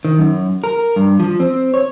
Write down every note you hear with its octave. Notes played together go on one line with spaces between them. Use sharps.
D#3
F#2
A#4
G2
F3
C4
C#5